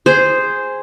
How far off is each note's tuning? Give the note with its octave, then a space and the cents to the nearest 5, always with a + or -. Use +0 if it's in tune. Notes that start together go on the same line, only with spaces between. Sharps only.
G#4 -10 C5 -5